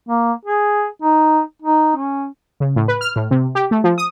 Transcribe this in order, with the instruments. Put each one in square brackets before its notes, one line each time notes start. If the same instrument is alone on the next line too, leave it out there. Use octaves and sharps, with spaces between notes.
[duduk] A#3
G#4
D#4
D#4
C#4
[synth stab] C#3
A2
B4
F6
A2
C3
G4
A3
F3
D#6